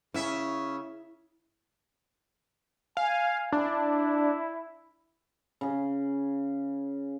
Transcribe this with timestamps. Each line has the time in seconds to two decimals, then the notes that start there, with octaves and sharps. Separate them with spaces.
0.14 C#3 C#4 E4 E5
2.97 F5 G#5
3.52 D4 E4
5.61 C#3 G#4